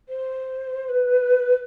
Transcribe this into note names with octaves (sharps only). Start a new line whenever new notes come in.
C5
B4